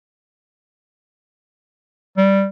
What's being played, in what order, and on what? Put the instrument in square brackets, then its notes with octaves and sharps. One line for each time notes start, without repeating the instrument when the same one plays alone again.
[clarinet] G3